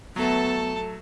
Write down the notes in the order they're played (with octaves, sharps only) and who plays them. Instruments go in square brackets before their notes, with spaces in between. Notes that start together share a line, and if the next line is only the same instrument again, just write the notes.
[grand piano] F#3 A3 [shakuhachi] B3 [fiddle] A4 A5